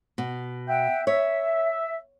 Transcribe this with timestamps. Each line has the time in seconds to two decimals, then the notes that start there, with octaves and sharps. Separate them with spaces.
0.18 B2
0.69 E5 F#5 G5
1.07 C#5 E5